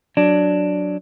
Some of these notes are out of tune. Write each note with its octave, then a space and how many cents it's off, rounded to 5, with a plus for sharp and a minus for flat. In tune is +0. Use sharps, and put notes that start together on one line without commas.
F#3 +0 D4 +0